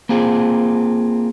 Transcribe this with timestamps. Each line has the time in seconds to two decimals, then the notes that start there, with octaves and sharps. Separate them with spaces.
0.09 A#3 C4 F4 G#4